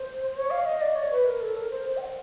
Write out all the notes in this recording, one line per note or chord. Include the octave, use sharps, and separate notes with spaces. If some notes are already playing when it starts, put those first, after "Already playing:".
Already playing: C5
C#5
F5
D#5
D5
C#5
B4
A#4
A4
A#4
C5
C5
G5
F#5